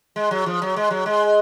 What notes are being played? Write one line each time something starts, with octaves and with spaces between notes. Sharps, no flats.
G#3
F#3
F3
F#3
G#3
F#3
G#3